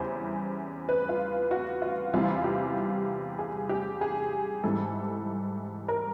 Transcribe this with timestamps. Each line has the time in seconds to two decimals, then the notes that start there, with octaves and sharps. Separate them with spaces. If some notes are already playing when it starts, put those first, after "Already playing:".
Already playing: E2 C#3 E3 G3 C5
0.89 B4
1.09 F4
1.51 F#4
1.82 F4
2.13 E2 C3 E3 G3 F4
2.44 G4
3.39 G#4
3.69 G4
4.01 G#4
4.64 G#2 E3 G3 A4
5.88 A#4